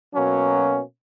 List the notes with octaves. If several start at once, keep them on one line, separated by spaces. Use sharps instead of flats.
B2 F#3 A#3 C#4